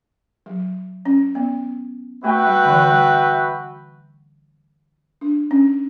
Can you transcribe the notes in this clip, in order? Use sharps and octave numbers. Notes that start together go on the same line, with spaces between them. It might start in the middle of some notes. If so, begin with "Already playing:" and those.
F#3
C#4
B3
A3 F#4 B4 E5 G5
G3
D3
E3
G3
D4
C#4